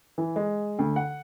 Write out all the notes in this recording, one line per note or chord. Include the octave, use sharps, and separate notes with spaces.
E3
G#3
D2
F#5